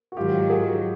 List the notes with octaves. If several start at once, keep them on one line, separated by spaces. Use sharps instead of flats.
F#4
G#2 D#3 F#3 F4 G4
F#4 G#4